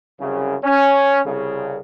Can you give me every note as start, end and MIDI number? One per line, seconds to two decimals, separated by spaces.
0.19 0.55 36
0.19 0.55 42
0.19 0.55 49
0.64 1.19 61
1.25 1.78 36
1.25 1.78 49